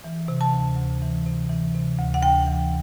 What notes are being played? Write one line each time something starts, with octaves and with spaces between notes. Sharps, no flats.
E3
C3
A5
D2
D2
E3
C3
E3
C3
D2
F#5
D2 G5
E3